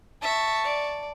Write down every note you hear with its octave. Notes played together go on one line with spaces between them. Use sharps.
E5 A5 C#6
D5